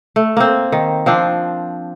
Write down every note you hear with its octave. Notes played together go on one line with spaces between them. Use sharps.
A3
A#3 C4
D#3
F3 C4 D4